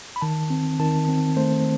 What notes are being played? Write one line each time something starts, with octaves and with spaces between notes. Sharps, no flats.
B5
D#3 A5
C4
D#3 A5
C4
A3 C5